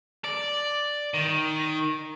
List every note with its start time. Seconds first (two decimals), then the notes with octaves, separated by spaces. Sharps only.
0.24 D5
1.14 D#3